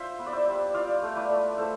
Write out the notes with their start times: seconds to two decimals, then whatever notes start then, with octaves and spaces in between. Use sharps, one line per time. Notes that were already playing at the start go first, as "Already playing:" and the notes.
Already playing: F4 C5 E5
0.19 B3
0.26 D5
0.33 C5 E5
0.47 G3
0.74 F4 D5 F5
1.02 A3
1.16 B4 D5
1.30 A3
1.57 A3 A4 C5